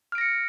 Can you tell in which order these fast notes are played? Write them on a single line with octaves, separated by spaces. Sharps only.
F6 D7 A#6 C#7